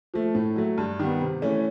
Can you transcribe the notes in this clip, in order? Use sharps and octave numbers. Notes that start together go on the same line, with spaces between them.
F3 A3
A2
F#3 A3
G2
D#3 G3 B3
C3
E3 A3 C#4